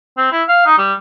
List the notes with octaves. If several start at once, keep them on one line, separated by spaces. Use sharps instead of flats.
C4
E4
F5
D#4
G3